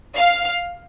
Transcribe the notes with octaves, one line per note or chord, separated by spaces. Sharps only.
F5